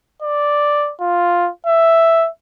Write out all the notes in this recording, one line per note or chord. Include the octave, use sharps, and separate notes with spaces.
D5
F4
E5